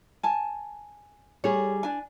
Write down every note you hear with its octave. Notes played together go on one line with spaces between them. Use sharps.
G#5 A5
G3 G#4 C#5
D4 G#5